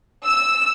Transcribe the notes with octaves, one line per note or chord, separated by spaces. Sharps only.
E6